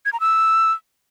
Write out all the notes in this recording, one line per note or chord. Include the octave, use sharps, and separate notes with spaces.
G#6
A#5
E6